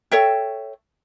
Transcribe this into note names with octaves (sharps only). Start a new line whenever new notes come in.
A4 C#5 E5 G5